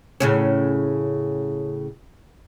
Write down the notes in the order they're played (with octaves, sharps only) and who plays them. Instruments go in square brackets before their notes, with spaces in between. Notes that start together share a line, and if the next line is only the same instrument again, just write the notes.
[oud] A2 C#3 C#4